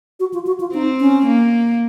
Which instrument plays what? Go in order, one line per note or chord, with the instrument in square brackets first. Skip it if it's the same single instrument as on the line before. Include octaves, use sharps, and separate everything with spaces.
[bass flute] F#4
F4
F#4
F4
[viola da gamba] C4 [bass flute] D#4
[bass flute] C#4
[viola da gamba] A#3